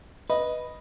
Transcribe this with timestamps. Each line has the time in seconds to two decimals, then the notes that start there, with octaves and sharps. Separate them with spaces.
0.30 B4 D#5